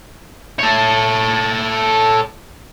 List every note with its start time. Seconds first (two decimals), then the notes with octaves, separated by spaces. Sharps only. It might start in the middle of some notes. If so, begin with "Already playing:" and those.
0.59 A4 C#5